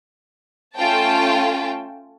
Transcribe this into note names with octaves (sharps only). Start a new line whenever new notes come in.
A3 C#4 F4 G5 A5